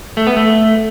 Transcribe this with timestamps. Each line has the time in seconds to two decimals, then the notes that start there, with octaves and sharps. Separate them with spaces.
0.17 A3
0.27 B3
0.37 A3